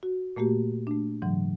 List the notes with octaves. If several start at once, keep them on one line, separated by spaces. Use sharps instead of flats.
F#4
A#2 A3 A#3 F#4 G4
A3 D4
G#2 C#3 E3 F#3